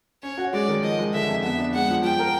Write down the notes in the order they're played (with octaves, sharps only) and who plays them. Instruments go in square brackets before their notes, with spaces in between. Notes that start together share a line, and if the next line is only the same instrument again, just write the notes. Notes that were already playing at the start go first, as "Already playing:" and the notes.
[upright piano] C#4 [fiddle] C#5
[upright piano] F#4
[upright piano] G#3 [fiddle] D5
[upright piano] D#3
[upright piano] F3 [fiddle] D#5
[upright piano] G#3
[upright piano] D3 [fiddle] E5
[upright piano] F2
[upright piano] B3 [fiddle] E5
[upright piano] D4
[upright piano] G#3 [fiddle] F#5
[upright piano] F3
[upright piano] F4 [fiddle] G5
[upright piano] A#4